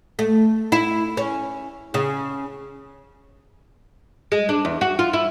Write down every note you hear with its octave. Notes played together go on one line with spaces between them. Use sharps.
A3
E4
C#4
C#3
G#3
D4
E2
F#4
F4
E4